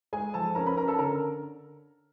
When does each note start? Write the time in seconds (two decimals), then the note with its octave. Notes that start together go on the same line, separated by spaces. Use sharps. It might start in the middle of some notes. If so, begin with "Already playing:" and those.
0.13 G#3 G#4 G#5
0.34 F3 A4 A5
0.55 C#4 A#4 A#5
0.66 B4 B5
0.77 C#4 A#4 A#5
0.88 A4 A5
0.99 D3 A#4 A#5